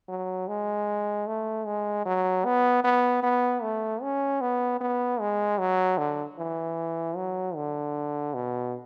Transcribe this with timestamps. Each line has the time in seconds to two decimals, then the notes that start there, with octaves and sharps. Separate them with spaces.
0.09 F#3
0.48 G#3
1.27 A3
1.66 G#3
2.05 F#3
2.45 B3
2.84 B3
3.23 B3
3.62 A3
4.02 C#4
4.41 B3
4.80 B3
5.20 G#3
5.59 F#3
5.98 D3
6.38 E3
7.16 F#3
7.56 D3
8.34 B2